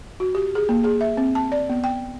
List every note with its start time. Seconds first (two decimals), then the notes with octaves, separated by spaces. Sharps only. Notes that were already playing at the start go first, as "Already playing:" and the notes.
0.20 F#4
0.35 G4
0.55 G#4
0.69 A#3
0.84 G#4
1.01 E5
1.17 C4
1.35 A5
1.52 D5
1.69 B3
1.84 G5